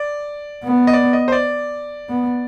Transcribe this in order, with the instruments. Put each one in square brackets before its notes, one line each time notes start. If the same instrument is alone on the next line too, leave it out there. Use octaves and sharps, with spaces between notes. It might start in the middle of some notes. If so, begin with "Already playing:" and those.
Already playing: [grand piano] D5
[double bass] B3
[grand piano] D#5
D5
D#5
C5
D5
[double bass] B3